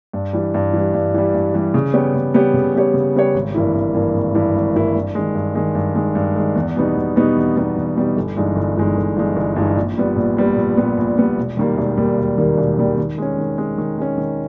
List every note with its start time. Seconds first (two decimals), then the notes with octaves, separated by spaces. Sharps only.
0.13 G2
0.33 E3 G3
0.54 G2
0.73 E3 G3
0.94 G2
1.14 E3 G3
1.35 G2
1.54 E3 G3
1.74 C#3
1.94 G3 B3 G4 C#5
2.15 C#3
2.34 G3 B3 G4 C#5
2.54 C#3
2.74 G3 B3 G4 C#5
2.94 C#3
3.15 G3 B3 G4 C#5
3.34 G#1
3.54 G2 E3 A#3 E4
3.75 G#1
3.94 G2 E3 A#3 E4
4.14 G#1
4.35 G2 E3 A#3 E4
4.55 G#1
4.75 G2 E3 A#3 E4
4.96 G2
5.15 D#3 G#3
5.35 G2
5.55 D#3 G#3
5.75 G2
5.95 D#3 G#3
6.15 G2
6.36 D#3 G#3
6.56 E2
6.76 B2 G3 B3 D#4
6.96 E2
7.16 B2 G3 B3 D#4
7.36 E2
7.56 B2 G3 B3 D#4
7.77 E2
7.96 B2 G3 B3 D#4
8.17 G1
8.37 G2 E3 G#3 D#4
8.56 G1
8.77 G2 E3 G#3 D#4
8.97 G1
9.16 G2 E3 G#3 D#4
9.36 G1
9.56 G2 E3 G#3 D#4
9.76 A#1
9.97 A#2 G3 B3
10.16 A#1
10.37 A#2 G3 B3
10.57 A#1
10.77 A#2 G3 B3
10.98 A#1
11.17 A#2 G3 B3
11.37 E1
11.57 D#2 D#3 G3 A#3
11.77 E1
11.97 D#2 D#3 G3 A#3
12.17 E1
12.38 D#2 D#3 G3 A#3
12.58 E1
12.78 D#2 D#3 G3 A#3
12.98 D#3
13.18 G#3 C#4
13.38 D#3
13.58 G#3 C#4
13.78 D#3
13.98 G#3 C#4
14.18 D#3